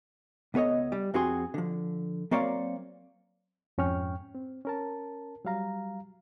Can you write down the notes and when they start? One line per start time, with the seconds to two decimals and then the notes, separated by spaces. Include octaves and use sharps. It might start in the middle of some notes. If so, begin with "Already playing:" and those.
0.54 C#2 B3 A4 C#5 D#5
0.92 G3
1.14 F2 C4 F#4 G#4 C6
1.54 D3 F3
2.31 F#3 A#3 C4 C#5 D5 F5
3.78 F2 G#2 C#4 G5 C#6 F6
4.35 C4
4.65 C#4 A#4 A5
5.45 F#3 G3 F5 A#5